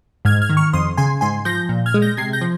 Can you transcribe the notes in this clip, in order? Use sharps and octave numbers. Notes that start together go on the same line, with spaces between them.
G#2 F6 G#6
F6 G#6
D#3
C#6 F6
F2 C6 D#6
C#3 G#5 C6
G#2 G#5 C6
F3 G6 A#6
A#2
F6 G#6
G#3
G6 A#6
C3 G#6 C7
G6 A#6
F3